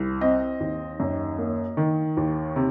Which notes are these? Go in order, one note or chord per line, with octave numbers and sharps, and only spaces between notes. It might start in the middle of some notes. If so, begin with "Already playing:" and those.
Already playing: C2
C4 D#5
D#2
F#2
A#3
D#3
D#2
C3